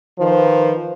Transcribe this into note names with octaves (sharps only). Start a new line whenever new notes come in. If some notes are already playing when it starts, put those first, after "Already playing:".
D#3 F3 B4 C5